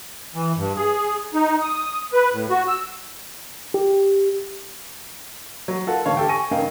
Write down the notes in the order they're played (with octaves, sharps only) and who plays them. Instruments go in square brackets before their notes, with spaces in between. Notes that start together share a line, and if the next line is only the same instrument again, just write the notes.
[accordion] E3
G2
G#4
D#4
D#6
B4
A2
F#4
E6
[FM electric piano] G4
[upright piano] F#3
F4 A4 A#4 F#5
A1 D3 C#5 F5 A5
G4 A4 G5
G#5 C#6 A#6 D#7
G2 C#3 D#4 A#4 F5 G5